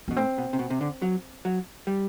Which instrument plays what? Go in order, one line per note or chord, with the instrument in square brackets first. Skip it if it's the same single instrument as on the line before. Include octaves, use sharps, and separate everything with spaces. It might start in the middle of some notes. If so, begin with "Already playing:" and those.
[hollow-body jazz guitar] B2 [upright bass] B3
[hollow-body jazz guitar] A2 [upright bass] C4
[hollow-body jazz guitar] B2
C3
B2
C3
D3
F#3
F#3
G3